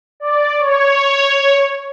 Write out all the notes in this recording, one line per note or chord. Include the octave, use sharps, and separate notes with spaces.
D5
C#5